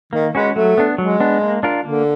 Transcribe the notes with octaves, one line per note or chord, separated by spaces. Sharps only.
D#3 A#3
G#3 C#4 F#4 B4
F#3 A3
B3 D4
F#3 G#3
B3 D4
A#3
D4 F4 A#4
D3 A#3